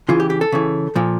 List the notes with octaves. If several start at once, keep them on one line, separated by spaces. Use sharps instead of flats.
C#3 E3 F4
G4
G4
A4
C#3 E3
A#2 F3